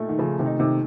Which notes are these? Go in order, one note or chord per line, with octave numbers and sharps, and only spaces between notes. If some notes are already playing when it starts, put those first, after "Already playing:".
Already playing: A#2 A3 D#4
D#3
C#3 F3 A3
C3 D#3
D#4
C3 D#3